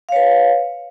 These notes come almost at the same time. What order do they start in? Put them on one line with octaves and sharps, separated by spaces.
F5 C#5 B4